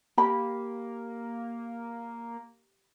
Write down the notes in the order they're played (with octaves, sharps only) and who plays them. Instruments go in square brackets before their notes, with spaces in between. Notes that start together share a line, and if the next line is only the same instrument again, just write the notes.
[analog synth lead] A#3 [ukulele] G4 B5